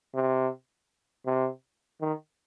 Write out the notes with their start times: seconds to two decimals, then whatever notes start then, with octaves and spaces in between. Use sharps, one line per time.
0.14 C3
1.26 C3
2.01 D#3